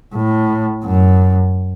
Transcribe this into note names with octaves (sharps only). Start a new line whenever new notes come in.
A2
F#2